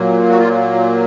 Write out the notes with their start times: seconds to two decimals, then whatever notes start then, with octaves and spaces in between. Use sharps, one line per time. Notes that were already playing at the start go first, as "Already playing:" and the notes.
Already playing: A#2 F#3 A#3
0.29 F#4
0.39 F4